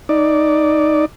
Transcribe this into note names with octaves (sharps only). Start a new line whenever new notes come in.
D#4 D5